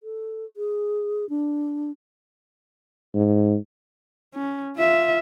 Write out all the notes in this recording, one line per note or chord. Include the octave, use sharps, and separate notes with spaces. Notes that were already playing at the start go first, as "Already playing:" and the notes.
A4
G#4
D4
G#2
C#4
F4 E5